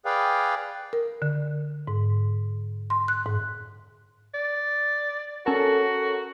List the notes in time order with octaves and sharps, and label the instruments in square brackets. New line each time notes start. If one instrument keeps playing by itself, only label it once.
[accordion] G#4 B4 D5 F5 G5
[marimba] A#4
D3
G#2
C6
F#6
G#2
[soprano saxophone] D5
[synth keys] C#4 A4 A#4 [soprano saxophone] F#4